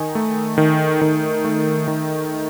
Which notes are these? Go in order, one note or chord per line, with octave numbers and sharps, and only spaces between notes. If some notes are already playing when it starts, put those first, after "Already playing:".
Already playing: D#3 D#4 G#5
A3
D#3
D#3
A3
D#3